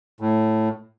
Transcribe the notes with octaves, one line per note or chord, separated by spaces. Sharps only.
A2